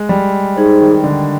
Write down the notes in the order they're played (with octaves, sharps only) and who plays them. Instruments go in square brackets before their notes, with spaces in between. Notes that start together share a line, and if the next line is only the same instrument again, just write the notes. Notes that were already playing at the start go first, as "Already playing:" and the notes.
Already playing: [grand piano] G#3
G3
[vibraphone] D#4 G#4 C5
[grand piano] D#3
D3